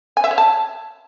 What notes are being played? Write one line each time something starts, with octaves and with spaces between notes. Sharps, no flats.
G#5
E5
C#5
A5